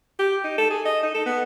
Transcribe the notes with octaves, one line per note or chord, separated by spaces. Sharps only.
G4
D#4
A4
G#4
D#5
D#4
A4
B3